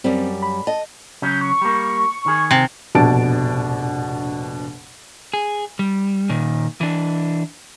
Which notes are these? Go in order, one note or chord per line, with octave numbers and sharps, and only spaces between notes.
F#2 G3 C4
B5
D#5 A5
C#3 F#3 C#4 G6
C#6
G3 A#3
D#3 G#4
C3
F1 A#1 B2 D4 A5 D7
G#4
G3
A#2 D#3
E3 D4